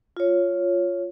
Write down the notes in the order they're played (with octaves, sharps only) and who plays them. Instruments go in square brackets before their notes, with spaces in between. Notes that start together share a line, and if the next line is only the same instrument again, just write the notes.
[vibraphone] F4 C#5